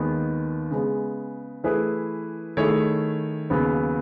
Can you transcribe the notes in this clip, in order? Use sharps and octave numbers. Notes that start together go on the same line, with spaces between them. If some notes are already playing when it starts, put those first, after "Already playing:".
Already playing: D#2 D#3 G#3 B3
C#3 G#3 B3
E3 A3 E4 G#4 B4
D#3 A3 E4 G#4 C#5
D#2 C#3 F#3 B3